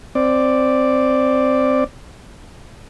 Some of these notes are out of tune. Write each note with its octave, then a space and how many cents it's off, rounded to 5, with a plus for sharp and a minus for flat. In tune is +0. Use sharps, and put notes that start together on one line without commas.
C4 +0 D5 +0